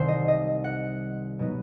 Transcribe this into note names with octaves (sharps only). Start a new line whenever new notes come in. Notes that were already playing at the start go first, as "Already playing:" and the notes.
Already playing: C2 C3 D#3 G3 C5
D#5
D#5
F#5
B2 F#3 B3 D#4